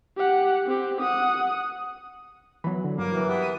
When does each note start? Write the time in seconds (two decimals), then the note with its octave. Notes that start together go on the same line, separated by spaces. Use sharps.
0.17 G4 F#5
0.66 C4 G4
1.01 F#5 D#6
2.64 E3 F#3 B3 B5
2.84 D3
2.98 G2 F#3 A#3
3.12 E3 F#4
3.29 B3 G4
3.42 D#7